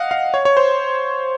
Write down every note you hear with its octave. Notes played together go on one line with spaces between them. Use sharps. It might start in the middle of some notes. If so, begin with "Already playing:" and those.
Already playing: D#5 F5 F#5
F5
C#5
C#5
C5